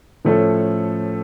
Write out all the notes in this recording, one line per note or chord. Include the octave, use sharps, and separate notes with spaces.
A2 F3 A3 C#4 A4